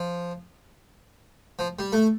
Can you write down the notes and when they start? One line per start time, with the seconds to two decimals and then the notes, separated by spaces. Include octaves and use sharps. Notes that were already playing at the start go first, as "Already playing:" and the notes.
Already playing: F3
1.59 F3
1.79 G3
1.93 A3